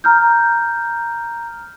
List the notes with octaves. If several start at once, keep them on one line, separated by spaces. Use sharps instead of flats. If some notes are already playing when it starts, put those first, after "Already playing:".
A#5 F6 G6